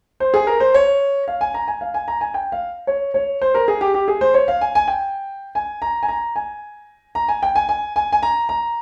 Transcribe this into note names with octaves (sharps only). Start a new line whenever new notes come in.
C5
G#4
A#4
C5
C#5
F5
G#5
A#5
G#5
F5
G#5
A#5
G#5
G5
F5
C#5
C#5
C5
A#4
G#4
G4
G4
G#4
C5
C#5
F5
G#5
G#5
G5
G#5
A#5
G#5
A#5
G#5
A#5
G#5
G5
G#5
G#5
G#5
G#5
A#5
A#5